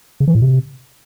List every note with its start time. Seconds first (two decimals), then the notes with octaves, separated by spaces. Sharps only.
0.20 C#3
0.28 E3
0.35 A2
0.42 C3